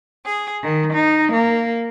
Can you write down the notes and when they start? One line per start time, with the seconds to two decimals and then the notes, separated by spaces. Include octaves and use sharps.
0.24 G#4
0.62 D#3
0.93 D#4
1.32 A#3